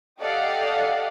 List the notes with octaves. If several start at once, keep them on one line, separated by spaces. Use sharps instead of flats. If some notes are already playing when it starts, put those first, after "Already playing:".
G4 A4 D5 D#5 F5 F#5